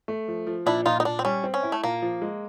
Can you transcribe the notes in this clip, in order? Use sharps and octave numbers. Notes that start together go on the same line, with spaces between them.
A3
F3
F3
A#2 D4 E4
A#2 D#4 F4
D#4
A#2 D4
C4
G3 C#4
C4
C#4
E4
A3
A#2 A#3
F3
G#3